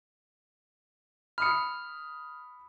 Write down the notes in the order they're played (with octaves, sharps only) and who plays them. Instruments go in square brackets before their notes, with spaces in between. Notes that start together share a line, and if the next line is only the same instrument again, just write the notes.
[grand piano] B5 D#6 C#7 [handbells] F6